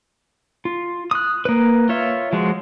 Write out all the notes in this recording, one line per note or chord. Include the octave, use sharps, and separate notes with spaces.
F4
D#6 F#6
A#3 B4
F4 C#5 E5
F3 G#3 F#4